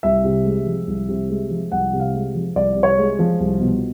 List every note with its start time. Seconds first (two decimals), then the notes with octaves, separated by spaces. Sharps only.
0.03 C2 E5
0.24 C3
0.45 G#3
0.66 F3
0.87 C2
1.09 C3
1.29 G#3
1.50 F3
1.72 C2 F#5
1.93 C3
2.00 F5
2.14 G#3
2.35 F3
2.55 C2 D5
2.76 C3
2.83 C#5
2.98 G#3
3.19 F3
3.40 C2
3.60 B2